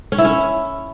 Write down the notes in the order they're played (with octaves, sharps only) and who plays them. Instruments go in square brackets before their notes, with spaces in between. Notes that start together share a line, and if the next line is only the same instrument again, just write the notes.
[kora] C#4
E4
C#4